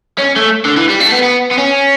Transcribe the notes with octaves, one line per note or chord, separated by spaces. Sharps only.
C#4
A3
D3
E3
G3
A3
B3
B3
B3
C#4